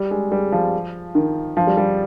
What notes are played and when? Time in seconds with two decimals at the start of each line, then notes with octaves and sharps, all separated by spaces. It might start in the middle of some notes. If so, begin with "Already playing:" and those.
Already playing: G3
0.11 G#3
0.32 G3
0.52 F3
1.15 D#3
1.57 F3
1.67 G3
1.77 G3